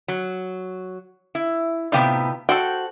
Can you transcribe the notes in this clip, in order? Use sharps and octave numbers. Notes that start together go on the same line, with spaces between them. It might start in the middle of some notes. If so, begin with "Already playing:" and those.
F#3
E4
A2 C3 B3 D#4 F4 G4
F#4 A4 C5 G5